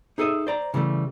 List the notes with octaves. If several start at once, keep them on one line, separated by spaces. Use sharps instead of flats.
D#4 G#4 A4 C#5 D#5 E5
C5 D5 A#5
C#3 E3 G3 A3